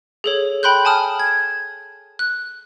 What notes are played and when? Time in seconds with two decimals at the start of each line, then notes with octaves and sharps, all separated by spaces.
0.24 G#4 A4 C#5
0.63 G5 B5 C6 F#6 G6
0.85 G#5 A5 D#6 F6
1.19 G#6
2.19 F#6